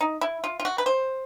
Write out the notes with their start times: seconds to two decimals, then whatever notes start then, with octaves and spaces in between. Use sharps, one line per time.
0.01 D#4
0.21 E4
0.44 F4
0.60 F4
0.65 F#4
0.78 B4
0.86 C5